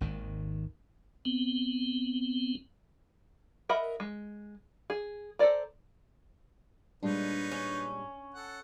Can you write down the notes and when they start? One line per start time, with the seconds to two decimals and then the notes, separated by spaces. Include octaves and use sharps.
0.01 G#1 D#2 G#2 D#3
1.25 B3 C4
3.69 A#4 D#5 E5 F#5 B5
4.00 G#3
4.90 G#4
5.39 A4 A#4 C5 D5 A#5
7.03 A#2 G3 G#3 D4 D#4 B4 C#5
7.51 C#4
8.35 A4 F#5